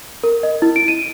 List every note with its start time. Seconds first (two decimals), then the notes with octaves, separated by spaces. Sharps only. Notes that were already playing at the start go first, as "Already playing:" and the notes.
0.24 A#4
0.43 D#5
0.62 E4
0.76 D7
0.88 D#7